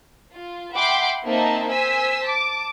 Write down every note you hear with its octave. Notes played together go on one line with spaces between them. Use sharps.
F4
E5 F#5 G5 B5 C6 D6
A#3 C4 D#4 C5 E5 A5
C5 G#5 E6 B6
A5 D6